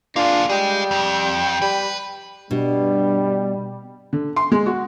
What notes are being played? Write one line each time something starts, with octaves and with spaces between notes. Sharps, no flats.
A#3 D4 F4 G#4
G3 G#4 D#5 G5
F2
G3 B4
G2 B2 G3
D3
C6
G#3
F#4